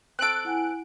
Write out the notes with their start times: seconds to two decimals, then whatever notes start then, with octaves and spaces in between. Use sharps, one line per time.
0.19 C4 A4 F#6 D7
0.45 E4 F#5 G#5